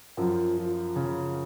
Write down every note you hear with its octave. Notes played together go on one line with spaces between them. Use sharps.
F#2 F3
F3
C#3